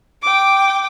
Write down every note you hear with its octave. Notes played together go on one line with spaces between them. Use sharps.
G5 D6